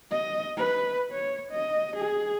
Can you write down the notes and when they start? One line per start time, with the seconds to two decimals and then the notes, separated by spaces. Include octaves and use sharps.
0.11 D#5
0.57 B4
1.11 C#5
1.52 D#5
1.96 G#4